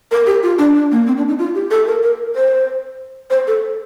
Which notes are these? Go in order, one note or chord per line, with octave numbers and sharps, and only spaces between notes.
A#4
G4
F4
D4
D4
A#3
C4
D4
D#4
F4
G4
A4
A#4
A#4
C5
C5
A4